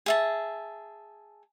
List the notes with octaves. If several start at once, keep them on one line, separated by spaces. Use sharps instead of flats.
G#4 E5 A5